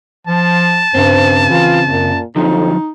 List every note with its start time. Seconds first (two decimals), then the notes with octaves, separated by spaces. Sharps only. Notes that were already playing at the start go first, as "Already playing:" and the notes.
0.27 F3 A5
0.95 G2 C#3 C4 C5
1.50 E3 F4
1.88 F#2 A#2
2.36 F2 D3 F3 F#3 D#4